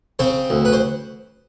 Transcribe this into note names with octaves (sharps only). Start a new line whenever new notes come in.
C#3 C4 C5
D2
B4
C5